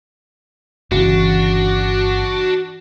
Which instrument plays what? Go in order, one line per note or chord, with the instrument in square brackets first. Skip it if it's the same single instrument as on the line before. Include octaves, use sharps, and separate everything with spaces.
[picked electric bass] G1 C#3 [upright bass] E3 [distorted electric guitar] D4 [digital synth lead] F#4